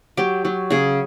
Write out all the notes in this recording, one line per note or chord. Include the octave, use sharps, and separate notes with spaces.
F#3 G4
F#3
C#3 G#4